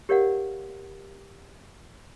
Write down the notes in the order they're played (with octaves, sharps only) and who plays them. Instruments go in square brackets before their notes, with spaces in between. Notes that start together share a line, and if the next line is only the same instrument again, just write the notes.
[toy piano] G4 A#4 C#5 D5 F5 F#5